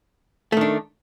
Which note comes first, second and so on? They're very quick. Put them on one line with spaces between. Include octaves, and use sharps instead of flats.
A3 D#3 D4